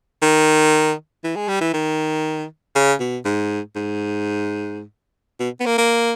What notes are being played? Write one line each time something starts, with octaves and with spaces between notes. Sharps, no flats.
D#3
E3
G#3
G3
E3
D#3
C#3
B2
G#2
G#2
B2
B3
A#3
A#3